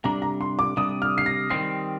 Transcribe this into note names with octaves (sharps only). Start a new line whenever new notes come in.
C3 G3 D4 A#5
A#5
C6
D6
C3 G3 D4 D#6
F6
C7
A#6
D#3 G3 C4 C7